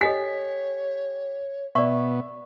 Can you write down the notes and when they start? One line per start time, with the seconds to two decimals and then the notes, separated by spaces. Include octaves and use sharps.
0.01 G4 A4 C#5 D#5 G#5 B6
1.75 B2 B3 D5 E5 C#6